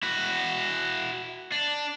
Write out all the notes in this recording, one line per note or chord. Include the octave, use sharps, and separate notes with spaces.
E4 F#4
D4